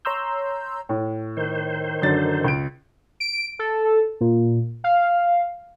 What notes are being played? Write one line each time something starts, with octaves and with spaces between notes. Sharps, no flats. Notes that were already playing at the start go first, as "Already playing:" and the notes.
C#5 A#5 C6 E6 G6
A2
D#3 C5
F#2 D3 A6
C#2 D7
D7
A4
A#2
F5